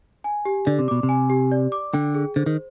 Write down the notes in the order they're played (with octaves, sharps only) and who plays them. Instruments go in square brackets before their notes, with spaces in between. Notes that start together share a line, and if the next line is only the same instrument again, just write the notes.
[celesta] G#5
G4
[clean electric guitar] D3 [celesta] D5
[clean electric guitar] C3
[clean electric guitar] B2 [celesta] D6
[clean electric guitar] C3
[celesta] G#5
G4
D5
D6
[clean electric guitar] D3 [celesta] G5
[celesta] G#4
[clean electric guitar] D3 [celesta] C5
[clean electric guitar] D#3